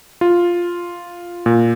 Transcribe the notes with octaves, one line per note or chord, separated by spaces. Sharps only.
F4
A#2